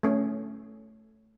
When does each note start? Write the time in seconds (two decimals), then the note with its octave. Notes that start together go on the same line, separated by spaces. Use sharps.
0.03 A3 C#4